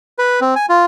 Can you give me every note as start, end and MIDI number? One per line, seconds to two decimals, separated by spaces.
0.19 0.40 71
0.41 0.55 60
0.56 0.66 80
0.69 0.86 65